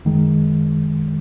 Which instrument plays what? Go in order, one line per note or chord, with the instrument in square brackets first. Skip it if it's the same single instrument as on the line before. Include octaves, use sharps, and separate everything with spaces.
[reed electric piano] F#2 D#3 G#3